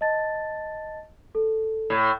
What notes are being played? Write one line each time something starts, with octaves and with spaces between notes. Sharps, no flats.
D#5 A5 A6
A4
A2